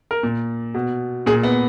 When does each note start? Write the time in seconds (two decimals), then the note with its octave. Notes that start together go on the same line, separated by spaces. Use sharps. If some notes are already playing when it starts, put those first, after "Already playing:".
0.11 A#4
0.23 A#2
0.74 B2
1.26 A#2 G#4
1.43 B3